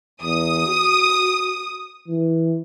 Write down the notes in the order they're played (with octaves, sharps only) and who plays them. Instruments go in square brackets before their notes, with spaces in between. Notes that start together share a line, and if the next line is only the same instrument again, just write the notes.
[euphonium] E2 [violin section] D#6
[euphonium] F#4
E3